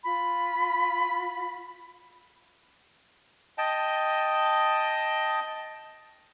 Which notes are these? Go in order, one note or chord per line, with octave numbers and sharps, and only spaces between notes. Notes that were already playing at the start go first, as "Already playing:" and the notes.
F4 B5
D#5 G5 A5